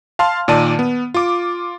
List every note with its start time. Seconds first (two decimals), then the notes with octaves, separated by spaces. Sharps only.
0.19 F5 A5 C6 F6
0.48 A#2 D#3 D5 A5 D#7
0.79 B3
1.14 F4 D6